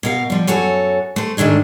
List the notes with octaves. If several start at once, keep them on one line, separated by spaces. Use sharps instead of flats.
B2 A#4 F5
F3 G3
F#2 F#4 A4 C#5 G#5
A3 C5
G#2 D#3 A3 D4 G#4